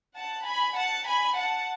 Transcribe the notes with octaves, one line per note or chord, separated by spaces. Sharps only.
F#5 A5
G#5 B5
F#5 A5
G#5 B5
F#5 A5